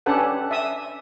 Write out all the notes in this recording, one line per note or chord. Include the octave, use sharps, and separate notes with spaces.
C#4 D4 G4 A4 B4 F#5
E5 D#6